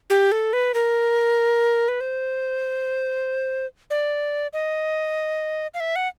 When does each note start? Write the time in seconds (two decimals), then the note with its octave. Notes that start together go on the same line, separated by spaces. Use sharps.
0.10 G4
0.32 A4
0.53 B4
0.74 A#4
1.88 B4
2.01 C5
3.90 D5
4.53 D#5
5.74 F5
5.80 E5
5.96 F#5